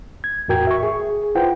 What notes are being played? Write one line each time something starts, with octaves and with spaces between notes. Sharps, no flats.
G#6
E2 A2 F#4 A#4 G5 G#6
E5 C#6
G#4
E4 F4 B4 C5 F#5 G5